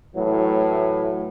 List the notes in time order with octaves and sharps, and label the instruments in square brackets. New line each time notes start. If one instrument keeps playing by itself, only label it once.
[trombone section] A2 E3 F#3